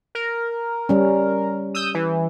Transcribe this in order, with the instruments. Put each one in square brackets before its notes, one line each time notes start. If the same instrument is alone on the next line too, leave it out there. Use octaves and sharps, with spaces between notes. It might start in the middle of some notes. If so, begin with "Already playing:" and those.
[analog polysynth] A#4
[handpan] G3 C#4
[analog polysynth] D#6 E6 G6
E3